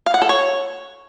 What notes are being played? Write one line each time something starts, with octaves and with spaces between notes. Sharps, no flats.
F5
F#5
A4
C#5